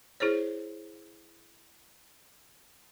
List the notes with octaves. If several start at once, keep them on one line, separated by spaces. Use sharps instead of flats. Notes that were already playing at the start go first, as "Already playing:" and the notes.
E4 G#4 C5 C#5